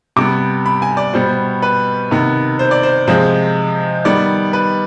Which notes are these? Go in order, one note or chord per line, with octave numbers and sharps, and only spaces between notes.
C3 G3 B3 D6
B5
G#5
D5
B2 G3 B3 C5
B4
C3 D#3 B3
C5
D5
C5
C3 F3 G#3 C5
D#3 G3 B3 D5
B4